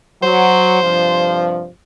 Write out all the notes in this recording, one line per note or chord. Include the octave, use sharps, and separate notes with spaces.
F#3 C5
G2 C3 F3